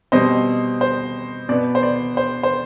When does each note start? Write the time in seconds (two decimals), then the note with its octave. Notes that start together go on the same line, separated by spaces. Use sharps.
0.12 B2 G3 C4 C5 D#5
0.81 C5
1.49 B2 B3 D5
1.75 C5
1.83 D5
2.17 C5
2.43 C5